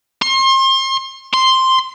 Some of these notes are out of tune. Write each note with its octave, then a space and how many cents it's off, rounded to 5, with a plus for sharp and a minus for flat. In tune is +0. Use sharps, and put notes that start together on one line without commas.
C6 +35
C6 +0